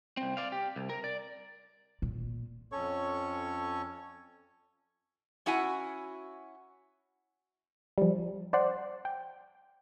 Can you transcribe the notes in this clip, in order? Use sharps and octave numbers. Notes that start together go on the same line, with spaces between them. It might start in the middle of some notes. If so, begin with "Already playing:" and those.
C2 C4
D5 F5
G4
C2
A#4
D5
A#2
F2 C#4 A4 C#5 C#6
C#4 E4 F#4 F#5 G#5
F3 G3
C5 D5 F#5 C6
G5